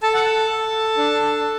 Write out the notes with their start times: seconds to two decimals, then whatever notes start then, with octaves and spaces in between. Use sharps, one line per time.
0.03 A4 A5
0.14 F#5
0.24 A5
0.50 A4
0.97 D4